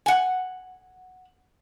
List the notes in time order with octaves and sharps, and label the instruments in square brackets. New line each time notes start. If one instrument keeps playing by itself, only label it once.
[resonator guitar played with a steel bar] F#5 G#5